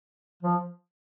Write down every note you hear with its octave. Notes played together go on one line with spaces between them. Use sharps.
F3